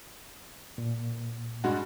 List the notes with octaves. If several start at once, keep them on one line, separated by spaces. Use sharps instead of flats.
A#2
G2 G#3 F#4